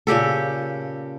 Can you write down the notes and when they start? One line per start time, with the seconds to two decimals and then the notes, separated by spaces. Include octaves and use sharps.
0.07 A#2 C#3 G4 A4